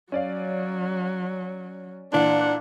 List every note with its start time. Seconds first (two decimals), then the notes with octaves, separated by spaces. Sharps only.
0.12 F#3 C#4 D5 F5
2.13 A#2 E3 A#3 D4 F#5